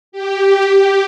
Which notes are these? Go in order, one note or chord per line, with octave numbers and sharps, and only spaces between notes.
G4